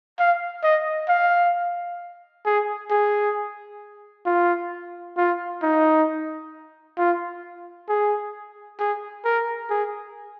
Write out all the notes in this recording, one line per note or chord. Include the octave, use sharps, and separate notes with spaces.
F5
D#5
F5
G#4
G#4
F4
F4
D#4
F4
G#4
G#4
A#4
G#4